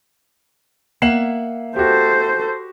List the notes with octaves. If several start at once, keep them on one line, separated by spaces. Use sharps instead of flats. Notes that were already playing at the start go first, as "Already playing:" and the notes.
A#3 E5 F#5 C7 E7 F#7
F#4 G4 A4 C5